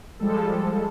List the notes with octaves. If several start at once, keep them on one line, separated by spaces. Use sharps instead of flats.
F3 G3 G#3 A4